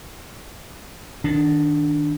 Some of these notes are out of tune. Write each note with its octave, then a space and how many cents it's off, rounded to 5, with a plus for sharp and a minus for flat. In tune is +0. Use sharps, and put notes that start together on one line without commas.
D#3 +0 D4 +0